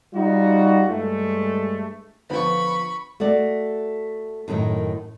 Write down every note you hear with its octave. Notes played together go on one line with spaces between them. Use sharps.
G3 D#4 F4 F#4
G2 G#3 A3
D3 F3 B3 B5 C#6
A3 F#4 A4 D5
F#2 A2 D#3 A4 A#4